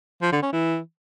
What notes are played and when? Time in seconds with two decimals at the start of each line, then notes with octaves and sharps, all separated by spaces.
0.22 F3
0.32 D3
0.42 C#4
0.52 E3